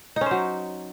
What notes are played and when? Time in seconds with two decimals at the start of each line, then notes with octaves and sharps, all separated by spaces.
0.16 D#4
0.21 C#4
0.26 C5
0.31 F#3